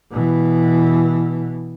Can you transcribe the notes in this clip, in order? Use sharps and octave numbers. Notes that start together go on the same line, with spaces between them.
B2 E3